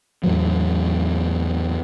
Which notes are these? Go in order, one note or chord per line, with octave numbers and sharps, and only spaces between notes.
E2 A2 F#3